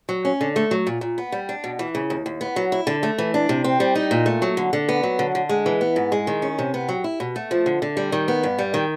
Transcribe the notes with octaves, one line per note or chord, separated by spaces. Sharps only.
F#3
C#4
D3
A3
F#3
A#2
A#2
B3
G3
D4
B2
E3
C#3
D#2
D#2
B3
F#3
E4
D3
A3
E3
D4
C3
C4
G3
D#4
A#2
A3
F#3
D3
D3
B3
F#3
D3
D3
G#3
E3
B3
G#2
G#3
D#3
C#4
C3
B3
F#3
E4
B2
A3
F3
D3
D3
G3
D#3
B3
G2
G3
D#3